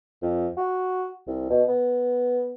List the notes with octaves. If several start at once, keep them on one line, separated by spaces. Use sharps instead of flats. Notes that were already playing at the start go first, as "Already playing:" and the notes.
F2
F#4
C2
B2
B3